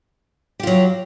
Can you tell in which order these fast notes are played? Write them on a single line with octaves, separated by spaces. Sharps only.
G4 F4 F#3